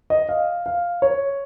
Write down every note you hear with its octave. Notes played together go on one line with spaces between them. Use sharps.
D#5
F5
F5
C#5